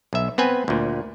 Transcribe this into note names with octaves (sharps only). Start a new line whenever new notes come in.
B1 E5
B3 C4 B4 G#5
D2 A#2